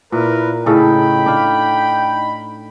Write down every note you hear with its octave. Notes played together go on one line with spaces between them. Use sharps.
A#2 E4 A#4 B4
A2 C#3 D#4 A4 G5 B5
D4 F5